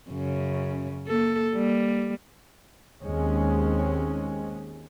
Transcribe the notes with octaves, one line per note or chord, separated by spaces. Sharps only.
F#2 C#3
A#3 A4
G3 A#3
D#2 G#3 C4 C#4